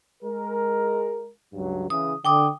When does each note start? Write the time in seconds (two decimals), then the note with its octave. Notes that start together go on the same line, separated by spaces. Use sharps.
0.23 G#3 A#4
1.54 C#2 G2 F#3
1.90 C#3 E3 D#6
2.25 D3 G5 D6 D#6